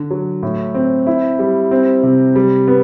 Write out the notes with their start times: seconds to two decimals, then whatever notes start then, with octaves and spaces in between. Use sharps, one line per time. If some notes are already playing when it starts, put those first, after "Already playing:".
Already playing: D3
0.11 F#3
0.43 A2
0.75 C4
1.07 E4
1.39 G3
1.71 C4
2.03 C3
2.36 G3
2.68 B3